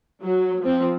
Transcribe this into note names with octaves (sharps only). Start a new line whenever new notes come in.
F#3
F3 C4